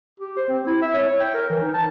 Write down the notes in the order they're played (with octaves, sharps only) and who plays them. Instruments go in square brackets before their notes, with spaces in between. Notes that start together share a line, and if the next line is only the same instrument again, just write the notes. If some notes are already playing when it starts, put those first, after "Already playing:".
[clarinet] G4
C5
C4
E4
E5
C#5
C#5
G5
A#4
E3
D#4
A5